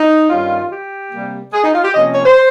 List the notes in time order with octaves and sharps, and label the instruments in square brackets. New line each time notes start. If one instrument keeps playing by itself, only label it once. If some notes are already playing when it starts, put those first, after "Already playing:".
Already playing: [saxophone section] D#4
G2 D#3 G3 C#4 F4
G4
C3 G3 A#3
G#4
D#4
F4
G4
C3 F3 A#3 C#4 D#5
C#5
C5